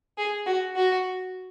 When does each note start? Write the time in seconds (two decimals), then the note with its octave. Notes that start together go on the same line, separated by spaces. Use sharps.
0.18 G#4
0.46 F#4
0.76 F#4